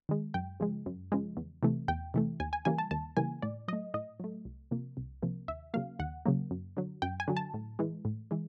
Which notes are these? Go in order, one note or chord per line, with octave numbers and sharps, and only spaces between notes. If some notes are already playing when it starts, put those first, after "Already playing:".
D#3 G#3
F#2 G5
C#3 F3 G#3
F#2
C#3 F3 G#3
E2
C3 E3 A3
E2 G5
C3 E3 A3
D#2 G#5
G#5
C#3 E3 G3 A#3 G#5
A5
D#2 A5
C#3 E3 G3 A#3 G#5
A2 D5
F#3 A3 D#5
A2 D#5
F#3 A3
C2
C3 F3 A#3
C2
C3 F3 A#3
D#2 E5
C#3 F#3 A#3 F5
D#2 F#5
C#3 F#3 A#3
F#2
D3 F#3
F#2 G5
G#5
D3 F#3
A5
A2
E3 G#3
A2
E3 G#3